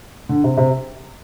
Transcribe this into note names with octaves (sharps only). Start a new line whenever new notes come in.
D3
C3
C3